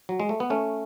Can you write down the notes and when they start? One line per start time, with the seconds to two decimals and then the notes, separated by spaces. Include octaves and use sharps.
0.09 F#3
0.20 G#3
0.29 A3
0.40 B3
0.50 A3 C#4